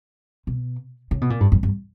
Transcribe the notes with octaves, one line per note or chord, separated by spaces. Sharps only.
B2
C#3
B2
A#2
G2
F#2
G2